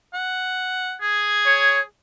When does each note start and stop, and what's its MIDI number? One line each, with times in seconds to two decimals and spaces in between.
0.14 0.95 78
1.01 1.82 68
1.01 1.84 92
1.46 1.79 73